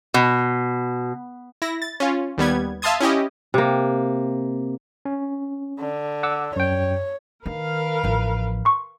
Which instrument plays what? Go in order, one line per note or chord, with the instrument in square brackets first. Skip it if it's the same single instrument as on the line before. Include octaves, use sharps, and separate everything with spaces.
[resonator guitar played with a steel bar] B2
[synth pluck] E4 A#6
A6
C#4 F4
D#2 G3 B3 G#6
E5 F5 A5 C6 D#6 G#6
C#4 E4 G4 D#5
[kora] C3 A#3
[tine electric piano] C#4
[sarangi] D3
[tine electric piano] F#5 D6 E6
[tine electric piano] F#2 G5 [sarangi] C#5
[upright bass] D#3 [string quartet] A#4 B4 F5
[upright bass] A1 F3
[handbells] C6 C#6